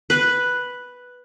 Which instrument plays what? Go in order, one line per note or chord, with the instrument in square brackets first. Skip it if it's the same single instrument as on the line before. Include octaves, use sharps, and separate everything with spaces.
[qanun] B4